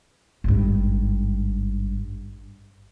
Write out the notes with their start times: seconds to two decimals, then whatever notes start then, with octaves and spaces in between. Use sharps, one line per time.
0.44 G#1 G2